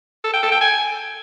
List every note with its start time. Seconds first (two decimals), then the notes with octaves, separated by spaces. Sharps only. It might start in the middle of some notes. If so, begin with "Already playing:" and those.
0.24 A4
0.33 G5
0.43 A4
0.52 G5
0.61 G#5